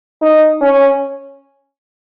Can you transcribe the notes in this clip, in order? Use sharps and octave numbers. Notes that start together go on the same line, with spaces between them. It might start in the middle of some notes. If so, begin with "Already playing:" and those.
D#4
C#4